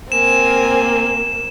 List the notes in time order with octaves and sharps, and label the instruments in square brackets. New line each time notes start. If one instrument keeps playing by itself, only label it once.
[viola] A#3 [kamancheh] C4 [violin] A#4 G#5 [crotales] E7